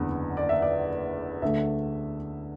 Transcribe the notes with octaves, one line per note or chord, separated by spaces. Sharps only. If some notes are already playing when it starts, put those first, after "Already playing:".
Already playing: F#1 E2 D3 B3
D5
E5
D5
D2 D3 A3 E5